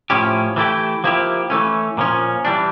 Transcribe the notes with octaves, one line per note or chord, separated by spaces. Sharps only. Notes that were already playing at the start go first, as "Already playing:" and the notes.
A2 F3 C#4 E4 G4
E3 A3 E4 G4
F3 A#3 E4 G4
E3 A3 C#4
A#2 F3 C#4
E3 G3 D4